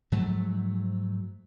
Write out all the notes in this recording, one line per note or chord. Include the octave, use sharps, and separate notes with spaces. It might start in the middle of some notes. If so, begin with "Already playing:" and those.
G#2 F3 F#3 A3